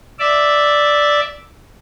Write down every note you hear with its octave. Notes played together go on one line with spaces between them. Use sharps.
D5 E5